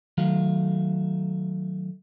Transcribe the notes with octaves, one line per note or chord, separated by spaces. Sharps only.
D#3 F#3 A3 F5